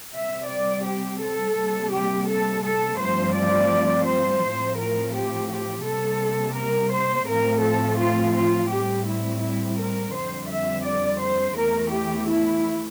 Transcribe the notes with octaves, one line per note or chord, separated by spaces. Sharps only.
C3 G3 C4 E5
D5
G4
A4
C3 G3 A#3
G4
A4
A4
G2 F3 A3 C4 C5
D5
C5
A2 F3 C4
A#4
G4
G4
C3 G3 A#3 A4
A#4
C5
A2 F3 A3 C4 A#4
A4
F4
F4
A2 G3 C4 G4
E4
E4
A#4
F2 D3 G3 C4 C5
E5
D5
C5
E2 E3 A3 A#4
G4
E4